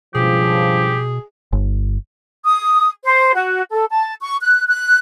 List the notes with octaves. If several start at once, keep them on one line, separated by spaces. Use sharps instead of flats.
C#2 G2 B2 F3 G4 G#4
G1
D#6
C5
F#4
A4
A5
C#6
F#6
F#6